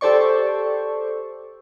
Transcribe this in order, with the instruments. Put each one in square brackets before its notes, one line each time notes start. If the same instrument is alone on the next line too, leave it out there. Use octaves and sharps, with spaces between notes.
[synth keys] G4 A4 C5 D5 C#6